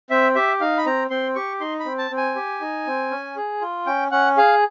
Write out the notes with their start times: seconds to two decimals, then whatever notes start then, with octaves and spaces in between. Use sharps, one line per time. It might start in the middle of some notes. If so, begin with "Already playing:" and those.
0.10 C4 E5
0.35 G4 E5
0.60 D#4 F5
0.78 B5
0.86 C4 A#5
1.10 C4 C6
1.35 G4 C#6
1.60 D#4 C6
1.80 B5
1.85 C4
1.98 A5
2.11 C4
2.17 G#5
2.35 G4
2.61 D#4
2.87 C4
3.11 C#4
3.36 G#4
3.61 F4
3.86 C#4 G5
4.11 C#4 F#5
4.37 G#4 F5